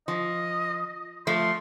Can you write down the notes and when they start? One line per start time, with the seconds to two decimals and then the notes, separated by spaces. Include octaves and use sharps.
0.08 F3 D#5
1.27 F3 A3 C6